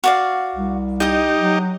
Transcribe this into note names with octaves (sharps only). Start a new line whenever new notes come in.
F#4 D5 F5
C2
D#4 G4 D#5 D#6
F#3